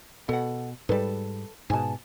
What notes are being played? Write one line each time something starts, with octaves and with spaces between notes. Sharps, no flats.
B2 A4 F#5
G#2 G3 A4 B4
G#2 B2 G#5 A5